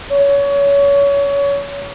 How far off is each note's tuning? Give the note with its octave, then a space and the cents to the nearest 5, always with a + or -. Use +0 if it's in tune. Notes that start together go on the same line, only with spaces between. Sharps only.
C#5 +25